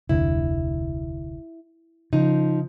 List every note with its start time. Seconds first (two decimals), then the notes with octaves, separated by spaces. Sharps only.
0.09 F1 D2 D3 E4
2.13 C#3 F3 D#4